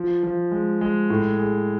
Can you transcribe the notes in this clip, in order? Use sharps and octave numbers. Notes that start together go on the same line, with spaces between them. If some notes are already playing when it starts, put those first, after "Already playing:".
Already playing: F3
F3
G#3
G#3
A2
G#4